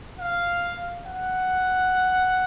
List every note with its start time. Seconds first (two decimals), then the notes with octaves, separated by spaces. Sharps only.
0.19 F5
1.06 F#5